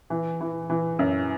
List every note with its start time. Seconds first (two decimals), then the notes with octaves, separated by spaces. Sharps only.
0.10 E3
0.41 E3
0.70 E3
0.99 F#2